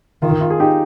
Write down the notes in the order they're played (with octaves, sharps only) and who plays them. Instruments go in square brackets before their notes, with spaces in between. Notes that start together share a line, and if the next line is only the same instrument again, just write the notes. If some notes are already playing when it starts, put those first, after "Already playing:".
[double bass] D#3 [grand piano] F4
[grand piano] F4
G#4
D#4 G4